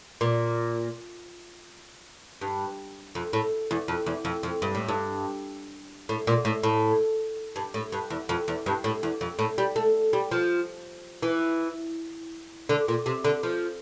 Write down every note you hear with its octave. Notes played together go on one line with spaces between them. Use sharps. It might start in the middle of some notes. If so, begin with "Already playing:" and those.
A#2
G2
F2
A2
E2
F2
E2
F2
F2
G2
A2
G2
A2
A#2
A2
A2
G2
A2
G2
E2
F2
E2
G2
A2
E2
F2
A2
G3
A3
G3
F3
E3
D3
A#2
C3
D3
F3